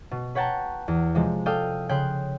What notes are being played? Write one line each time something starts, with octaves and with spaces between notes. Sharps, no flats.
B2
B4 C#5 F#5 G5 A5 A#5
E2
C3 F3 G#3
A4 D5 F5 G5 D#6
C#3 G5 C6 F#6